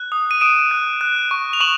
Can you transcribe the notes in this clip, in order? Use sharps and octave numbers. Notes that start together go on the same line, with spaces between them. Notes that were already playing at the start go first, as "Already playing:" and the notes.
Already playing: F#6
D#6
D#7
D#6 D7 E7
F#6
F#6
C#6
F7
C#6 E7 F#7